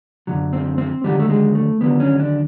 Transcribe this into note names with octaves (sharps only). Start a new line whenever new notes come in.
F#2 D3 F#3
C4
C4
D#2 D3 F#3 G3
A3
G#3
A3
D#2 D3 F#3 B3
C#4
D4